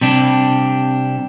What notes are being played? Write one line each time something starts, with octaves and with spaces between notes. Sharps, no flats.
C3 G3 D4